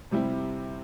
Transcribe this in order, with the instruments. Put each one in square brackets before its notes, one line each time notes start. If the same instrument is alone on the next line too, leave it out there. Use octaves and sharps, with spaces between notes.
[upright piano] C3 G3 C4 E4